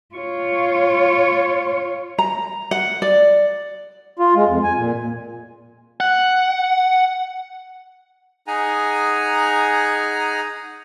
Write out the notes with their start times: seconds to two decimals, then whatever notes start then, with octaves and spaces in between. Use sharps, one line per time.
0.15 F4 C#5
2.19 A#5
2.71 F#5
3.02 D5
4.19 F4
4.36 G#3
4.47 F2
4.63 G#5
4.77 A#2
6.00 F#5
8.47 D#4 G#4 F#5 G#5 A#5